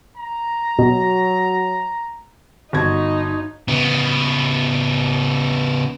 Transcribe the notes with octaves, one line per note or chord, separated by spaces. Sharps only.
A#5
B2 F#3
G1 D#4 F#4 G#6
C#3 B3